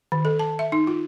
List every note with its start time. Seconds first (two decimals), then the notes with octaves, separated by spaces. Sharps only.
0.12 D#3
0.25 A4
0.39 A5
0.59 E5
0.72 D#4
0.87 F4